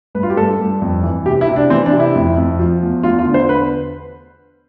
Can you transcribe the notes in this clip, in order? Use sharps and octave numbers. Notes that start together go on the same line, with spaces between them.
G2 B4
F4
G4
G2 A4
G2
F2
E3
C3 G4
E4
C3
D4
E3 C4
D4
C3
E4
F2
F2
F3
E2
E2 F4
F4
D3
C5
E2 B4